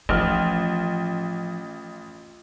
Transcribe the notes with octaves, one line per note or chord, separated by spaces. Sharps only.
A1 F3 F4 G4 C6 F6